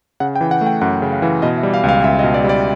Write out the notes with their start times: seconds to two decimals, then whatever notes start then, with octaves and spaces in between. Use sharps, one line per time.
0.20 C#3 F#5
0.36 G5
0.41 E3
0.51 F#5
0.61 A3
0.66 G5
0.81 F#2 F#5
1.02 C#3
1.12 F5
1.22 E3
1.42 B2 D#5
1.58 E5
1.63 G3
1.74 F5
1.84 C#2
1.89 F5
2.04 C#2 E5
2.19 D#5
2.24 B2
2.34 D5
2.44 G3
2.49 D5